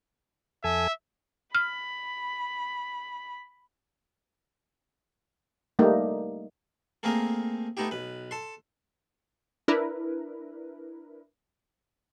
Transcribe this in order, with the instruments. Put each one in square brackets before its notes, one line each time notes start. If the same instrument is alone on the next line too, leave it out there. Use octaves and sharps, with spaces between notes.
[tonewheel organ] F2 A4 G#5 [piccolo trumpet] E5
[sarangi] B5 [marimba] F6
[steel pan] G3 A3 A#3 D#4
[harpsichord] A3 A#3 C4 G#4 A#4
A3 B3 D#4 E4 G4
B1 B4
A4 C6
[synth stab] D4 E4 A#4 B4